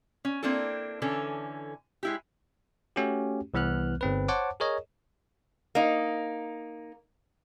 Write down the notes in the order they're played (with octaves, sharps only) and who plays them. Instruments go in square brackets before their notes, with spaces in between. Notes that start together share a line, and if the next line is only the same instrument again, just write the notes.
[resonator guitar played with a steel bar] C#4
A#3 C4 D4 E4 A4
D3 E3 C#4 A4
G#3 E4 G4
[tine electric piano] A3 C#4 F#4 G4
C2 E3 B3 F6 F#6
G1 C4 B4
C5 C#5 F#5 A5 D6
G#4 A#4 C#5 D#5
[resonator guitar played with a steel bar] A#3 D#4